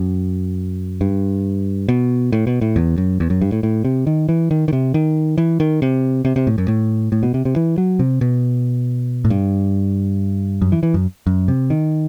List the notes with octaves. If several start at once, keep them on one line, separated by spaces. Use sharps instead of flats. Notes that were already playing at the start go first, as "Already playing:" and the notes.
Already playing: F#2
G2
B2
A2
B2
A2
E2
F#2
E2
F#2
G2
A2
A2
C3
D#3
E3
D#3
D#3
C3
D#3
E3
D#3
C3
C3
C3
A2
F#2
A2
A2
B2
C3
C3
E3
F#3
C3
B2
A2
G2
F#2
E3
E3
F#2
F#2
C3
D#3